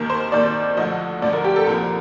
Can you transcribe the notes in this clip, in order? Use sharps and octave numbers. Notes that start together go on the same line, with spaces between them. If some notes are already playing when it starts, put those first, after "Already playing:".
Already playing: D#2 D#3 A#4
C5
D#2 D#3 D5
D2 D3 F3 D#5
D2 D3 F3 D5
A#4
G4
A4
C2 A#2 F3 A#4